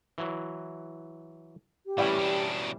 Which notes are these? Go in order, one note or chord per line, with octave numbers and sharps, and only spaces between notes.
E3 F#3
G4
A2 E3 G3 C#4 D5 G5
B2 D4